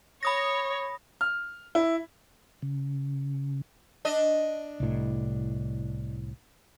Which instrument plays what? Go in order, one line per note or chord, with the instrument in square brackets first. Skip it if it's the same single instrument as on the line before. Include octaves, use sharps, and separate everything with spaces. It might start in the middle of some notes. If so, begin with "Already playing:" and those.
[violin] C#5 [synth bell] B5 D#6 A#6
[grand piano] F6
E4
[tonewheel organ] C#3
[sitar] D4 D#5
[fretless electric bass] C2 A2